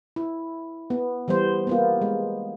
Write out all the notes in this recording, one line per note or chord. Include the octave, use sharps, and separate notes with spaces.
E4
B3
E3 G3 B3 C5
A#3 B3 F4
G#3